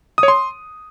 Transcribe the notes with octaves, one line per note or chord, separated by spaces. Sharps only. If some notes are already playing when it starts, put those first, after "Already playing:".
D#6
C#5
C6